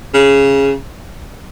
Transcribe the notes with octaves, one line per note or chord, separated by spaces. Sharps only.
C#3